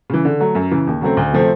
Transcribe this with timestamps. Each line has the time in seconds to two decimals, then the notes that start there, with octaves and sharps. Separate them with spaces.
0.10 C#3 E3
0.25 D3
0.40 F#3 A3
0.55 F#2
0.71 C#3 E3
0.87 D#2
1.01 C#3 F#3 A3 C4
1.17 D2
1.33 C3 F3 A3 C4